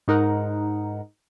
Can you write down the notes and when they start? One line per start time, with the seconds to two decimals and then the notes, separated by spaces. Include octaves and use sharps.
0.08 G#2 D#4 A#4 F#5